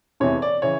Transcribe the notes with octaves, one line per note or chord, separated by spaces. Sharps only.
F1 E2 C3 E3 C#5
D5
C#3 E3 C#5